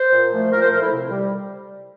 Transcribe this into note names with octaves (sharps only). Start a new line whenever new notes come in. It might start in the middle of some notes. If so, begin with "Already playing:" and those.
Already playing: C5
A#2
F3 A3
A#2 A#4
C5
F3 A3 A#4
E4
C3
G3